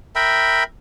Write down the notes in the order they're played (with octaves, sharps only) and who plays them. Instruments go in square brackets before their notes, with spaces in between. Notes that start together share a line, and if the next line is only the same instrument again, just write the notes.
[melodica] A#4 E5 G5 B5